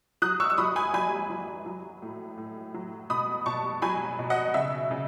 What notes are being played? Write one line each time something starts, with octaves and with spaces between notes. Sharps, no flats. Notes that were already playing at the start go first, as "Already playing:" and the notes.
F#3 D#6 F#6
C#6 E6
E6
F#3 B5 D#6
G#5 B5
F#3 G#5 B5
F#3
F#3
A2
A2
F#3
B2 B5 D#6
B2 A5 C#6
F#3 G#5 B5
B2
D#5 F#5
C#3 E5
C#3